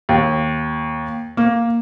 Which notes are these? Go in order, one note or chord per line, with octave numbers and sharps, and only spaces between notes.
D#2
A#3